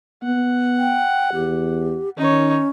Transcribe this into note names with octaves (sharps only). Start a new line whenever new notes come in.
B3 F#5
G5
E2 G4
D#3 C#4 D#4 C#5